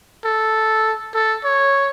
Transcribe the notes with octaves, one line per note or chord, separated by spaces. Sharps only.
A4
A4
C#5